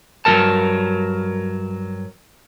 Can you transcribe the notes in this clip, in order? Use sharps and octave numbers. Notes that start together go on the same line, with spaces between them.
G2 F3 F#3 A#4 A5